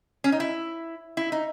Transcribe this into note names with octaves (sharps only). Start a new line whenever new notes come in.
C#4
D#4
E4
E4
D#4